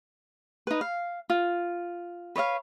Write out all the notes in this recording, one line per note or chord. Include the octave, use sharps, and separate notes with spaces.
D#4 B4
F5
F4
B4 C#5 D#5 F5